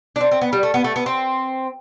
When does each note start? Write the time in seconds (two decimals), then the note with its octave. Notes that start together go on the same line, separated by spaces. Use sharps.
0.16 D4
0.21 C4
0.32 C4
0.41 B3
0.53 G3
0.63 A3
0.74 B3
0.84 A3
0.96 B3
1.06 C4